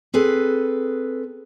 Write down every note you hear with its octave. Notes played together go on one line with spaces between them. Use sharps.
C4 G#4 A4 B4